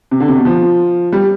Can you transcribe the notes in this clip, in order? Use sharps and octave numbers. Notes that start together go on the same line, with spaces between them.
C3
D3
C3
B2
F3
G3